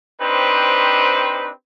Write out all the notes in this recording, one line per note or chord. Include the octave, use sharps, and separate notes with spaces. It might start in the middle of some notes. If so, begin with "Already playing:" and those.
C4 D4 D#4 G4 B4 C5